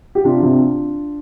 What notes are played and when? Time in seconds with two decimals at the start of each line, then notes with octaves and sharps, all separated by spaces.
0.15 G4
0.24 C3 D4 F4
0.42 C3